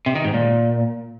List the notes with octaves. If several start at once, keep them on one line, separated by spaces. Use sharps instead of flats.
C3
D#3
G#2
A#2